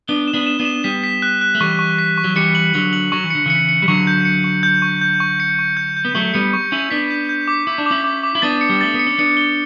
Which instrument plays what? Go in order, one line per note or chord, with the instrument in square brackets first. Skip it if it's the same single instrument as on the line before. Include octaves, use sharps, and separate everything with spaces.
[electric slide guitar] B3 D4 [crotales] G7
[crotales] E7
[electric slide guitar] B3 D4
[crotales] E7
[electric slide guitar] B3 D4
[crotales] E7
[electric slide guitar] G3 B3 [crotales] B6
[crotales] B6
F#6
F#6
[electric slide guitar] A3
[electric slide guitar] E3 G3 [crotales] C#6
[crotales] C#6
B6
C#6
[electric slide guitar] F#3
[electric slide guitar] E3 G3 [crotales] C#7
[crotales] F#7
[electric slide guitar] D3 F#3 [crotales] F#7
[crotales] F#7
[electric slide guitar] F#3 [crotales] C#6
[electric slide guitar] E3
[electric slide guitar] D3 [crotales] C#7
[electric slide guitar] C#3 E3 [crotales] C#7
[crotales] C#7
[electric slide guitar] G3
[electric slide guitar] D3 F#3 [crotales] C#6
[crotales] G6
C#7
C#6
G6
C#6
G6
C#6
C#7
C#6
G6
G6
[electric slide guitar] B3
[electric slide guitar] F#3 A3 [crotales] C#6
[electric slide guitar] G3 B3 [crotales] C#7
[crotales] C#6
[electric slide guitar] C#4 E4 [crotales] C#6
[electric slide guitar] B3 D4 [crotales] B6
[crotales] G6
G6
D6
[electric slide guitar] E4 [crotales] D6
[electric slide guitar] D4
[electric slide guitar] C#4 E4 [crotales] D6
[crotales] D6
D6
[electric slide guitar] E4
[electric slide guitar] B3 D4 [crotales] A6
[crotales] C#7
[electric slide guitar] G3
[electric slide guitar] A3 [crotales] A6
[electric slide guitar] B3
[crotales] C#7
[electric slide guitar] C#4
[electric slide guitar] B3 D4 [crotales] C#7
[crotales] G7